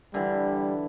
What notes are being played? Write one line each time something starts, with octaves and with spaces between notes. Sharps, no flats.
D3 E3 G3